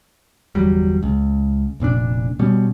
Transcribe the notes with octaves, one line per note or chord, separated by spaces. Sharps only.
G1 E2 F#3 G3
C#2
F1 A#2 C4 D4
B2 G3 C#4